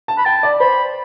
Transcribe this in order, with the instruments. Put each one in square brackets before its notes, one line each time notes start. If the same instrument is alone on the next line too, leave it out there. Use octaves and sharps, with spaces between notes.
[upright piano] A5
[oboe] B5
[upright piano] G5 [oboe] A5
[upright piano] D5
[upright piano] C5 [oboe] B5